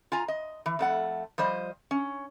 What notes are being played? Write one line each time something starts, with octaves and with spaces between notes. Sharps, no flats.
F4 G#5 A#5
D#5
E3
F2 A3 F#5
F3 G3 C5 D#5
C#4